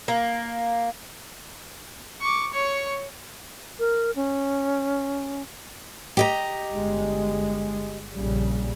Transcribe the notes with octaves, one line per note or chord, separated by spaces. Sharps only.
A#3
C#6 D6
C#5 C#6
A#4
C#4
G4 D#5 A#5
G1 G#3
A#1 C#3 G3